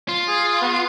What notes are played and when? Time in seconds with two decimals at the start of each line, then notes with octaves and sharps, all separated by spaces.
0.09 F4
0.28 G#4
0.62 B3